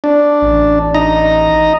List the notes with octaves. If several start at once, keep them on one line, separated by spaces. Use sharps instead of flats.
D4
A1
D#4 D#5 A#5